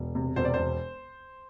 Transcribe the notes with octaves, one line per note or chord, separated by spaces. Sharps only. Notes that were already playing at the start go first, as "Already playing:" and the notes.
Already playing: E1
C3
E1 C5
D5
E1 C5